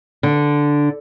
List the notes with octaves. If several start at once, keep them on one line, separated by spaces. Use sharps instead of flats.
D3